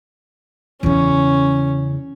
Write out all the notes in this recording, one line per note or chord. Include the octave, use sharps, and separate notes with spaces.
E2 C#3 C#4